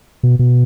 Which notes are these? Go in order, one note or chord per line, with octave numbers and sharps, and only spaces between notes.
B2
B2